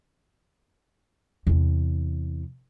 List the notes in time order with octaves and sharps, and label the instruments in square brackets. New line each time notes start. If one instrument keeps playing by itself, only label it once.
[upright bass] E2 C3